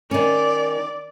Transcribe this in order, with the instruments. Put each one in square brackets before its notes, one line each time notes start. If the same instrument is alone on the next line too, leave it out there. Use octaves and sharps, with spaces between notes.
[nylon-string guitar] D#3 C#4 [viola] D5